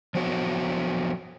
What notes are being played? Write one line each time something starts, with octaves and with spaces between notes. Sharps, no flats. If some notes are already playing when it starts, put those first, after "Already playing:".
F3 F#3 B3 F#4 C#5